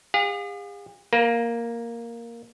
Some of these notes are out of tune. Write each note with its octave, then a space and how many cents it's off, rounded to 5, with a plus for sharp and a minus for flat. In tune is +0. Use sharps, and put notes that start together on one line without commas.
G#4 -45 F5 +35
A#3 +0 A#4 +35